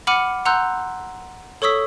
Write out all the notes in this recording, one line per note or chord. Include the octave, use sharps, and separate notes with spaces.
F#5 B5 D6 F6 C#7 D#7
F#5 A#5 C6 E6 F#6 G6
A4 C#5 C#6 D#6 E6 B6